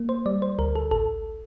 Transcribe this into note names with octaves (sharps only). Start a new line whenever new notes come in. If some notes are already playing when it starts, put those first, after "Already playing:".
Already playing: A#3
C5
G3 D5
C5
D2 A#4
A4
A1 A4